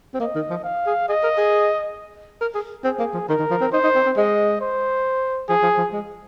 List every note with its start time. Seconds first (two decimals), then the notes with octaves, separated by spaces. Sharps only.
0.14 C4
0.20 A#3 D#5
0.35 D#3
0.50 F3
0.64 F5
0.87 G#4
1.09 G#4 D#5
1.23 A#4
1.38 G#4
2.41 A#4
2.55 G#4
2.84 C4 G#4
2.99 A#3
3.14 F3
3.29 D#3 A#4
3.39 D#3
3.51 F3
3.61 C4
3.72 D#4 C5
3.84 D#4
3.95 C4
4.06 C4
4.17 G#3 D#5
4.61 C5
5.49 F3 G#4
5.63 F3
5.78 F3
5.93 G#3